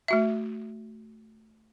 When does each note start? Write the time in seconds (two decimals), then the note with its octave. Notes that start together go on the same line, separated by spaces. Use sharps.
0.08 A3 F#4 E5